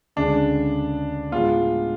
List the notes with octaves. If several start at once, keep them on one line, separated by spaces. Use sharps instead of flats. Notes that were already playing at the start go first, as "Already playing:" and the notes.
D2 C#3 G#3 D4
A2 G#3 B3 F4